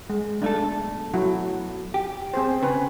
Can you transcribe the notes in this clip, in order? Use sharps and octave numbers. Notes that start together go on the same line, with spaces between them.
G#3
B1 A3 D4 A4
F#3 E4 F#4
G4
C4 G#4 C5
C#3 B4